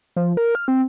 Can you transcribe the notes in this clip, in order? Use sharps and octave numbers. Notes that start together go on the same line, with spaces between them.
F3
A#4
F6
C4